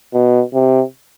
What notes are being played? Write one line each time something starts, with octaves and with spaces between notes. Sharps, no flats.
B2
C3